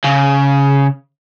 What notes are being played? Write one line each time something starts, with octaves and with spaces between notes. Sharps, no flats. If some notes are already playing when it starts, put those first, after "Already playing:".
C#3